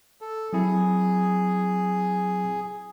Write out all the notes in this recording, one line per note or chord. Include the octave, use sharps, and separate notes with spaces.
A4
F#3 C4 E4 G#4